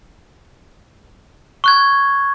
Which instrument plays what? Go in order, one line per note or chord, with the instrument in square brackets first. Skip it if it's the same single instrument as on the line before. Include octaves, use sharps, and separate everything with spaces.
[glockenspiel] C#6 F#6 G#6